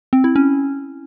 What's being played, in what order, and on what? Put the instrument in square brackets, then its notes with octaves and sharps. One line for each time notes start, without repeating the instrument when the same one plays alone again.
[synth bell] C4
E4
C#4